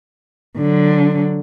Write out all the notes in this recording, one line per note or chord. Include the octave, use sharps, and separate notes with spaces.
D3 F#3